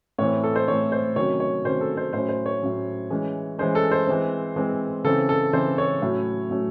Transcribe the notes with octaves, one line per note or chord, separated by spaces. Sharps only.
A2 E3 C4 C#5
A4
C5
A2 E3 C4 C#5
C5
C3 D#3 F#3 C#4 C#5
C#5
C3 D#3 F#3 C#4 C5
A4
C5
A2 F#3 C#4 C5
C5
C#5
A2 F#3 C#4
E3 G#3 C#4
E3 G#3 C#4 C5
A4
C5
E3 G#3 C4
E3 G#3 C4
C#3 E3 C4 A4
A4
C#3 E3 C4 C5
C#5
A2 F#3 A3 C#4
A2 F#3 A3 C#4